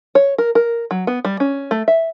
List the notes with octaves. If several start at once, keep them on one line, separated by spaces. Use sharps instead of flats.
C#5
A#4
A#4
F#3
B3
G3
C#4
A3
E5